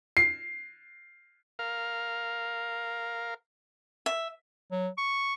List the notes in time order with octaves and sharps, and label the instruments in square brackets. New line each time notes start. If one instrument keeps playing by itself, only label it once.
[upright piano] C7
[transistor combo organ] A#4 F5
[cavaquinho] E5
[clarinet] F#3
C#6